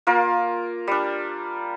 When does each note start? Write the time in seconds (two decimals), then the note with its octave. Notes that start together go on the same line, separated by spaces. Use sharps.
0.07 A#3 F4 A#4
0.87 G3 D4